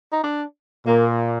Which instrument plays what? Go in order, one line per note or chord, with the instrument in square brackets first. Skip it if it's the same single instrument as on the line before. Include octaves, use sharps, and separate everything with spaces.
[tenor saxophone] D#4
D4
[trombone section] A#2 [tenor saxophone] A#3